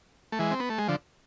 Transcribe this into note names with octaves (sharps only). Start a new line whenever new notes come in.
A3
E3 G#3
C4
B3
A3
G#3
D3 F3